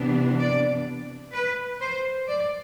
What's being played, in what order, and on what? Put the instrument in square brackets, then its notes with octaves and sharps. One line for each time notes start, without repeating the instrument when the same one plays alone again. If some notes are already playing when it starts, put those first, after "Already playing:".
Already playing: [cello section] C3 E3 B3 D4
D5
B4
C5
D5